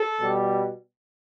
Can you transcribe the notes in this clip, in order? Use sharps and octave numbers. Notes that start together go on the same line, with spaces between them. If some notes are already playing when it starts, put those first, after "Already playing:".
Already playing: A4
B2 G3